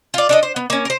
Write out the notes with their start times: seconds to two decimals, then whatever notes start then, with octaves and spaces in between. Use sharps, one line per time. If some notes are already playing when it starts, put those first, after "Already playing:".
0.14 F4 D5
0.29 D4 A4 D#5
0.43 C5
0.56 B3
0.70 A#3 C#4
0.85 A#4 C5